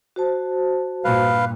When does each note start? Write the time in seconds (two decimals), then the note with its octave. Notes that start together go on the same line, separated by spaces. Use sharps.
0.16 F#4 C5 A5
1.04 G2 A#2 B4 F5